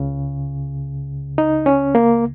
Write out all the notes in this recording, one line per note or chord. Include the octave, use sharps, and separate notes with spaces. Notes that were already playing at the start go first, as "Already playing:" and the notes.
Already playing: C#2 C#3
D#4
C#4
A#3